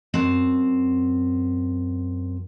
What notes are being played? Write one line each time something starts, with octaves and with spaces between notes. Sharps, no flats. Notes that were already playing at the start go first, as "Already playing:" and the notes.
F#2 C4